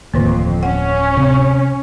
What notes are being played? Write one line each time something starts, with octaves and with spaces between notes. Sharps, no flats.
D1 F2 D3 D#3 A#3
C#4 F#5
C3